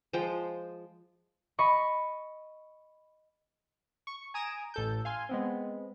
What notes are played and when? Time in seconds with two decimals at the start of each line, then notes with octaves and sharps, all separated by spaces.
0.13 F3 G#3 C5 G5
1.59 D#5 B5 C#6
4.07 C#6
4.34 G#5 A#5 D#6 D7 E7
4.74 A1 A4 G6
5.05 F5 G#5 C6
5.29 G#3 B3 C4